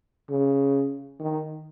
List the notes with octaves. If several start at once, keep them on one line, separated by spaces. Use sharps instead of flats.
C#3
D#3